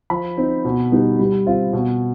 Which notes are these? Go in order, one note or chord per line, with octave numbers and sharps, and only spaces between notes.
F3 B5
C4 D#4
B2
G3 B3 D#4
G3
C4 F4
B2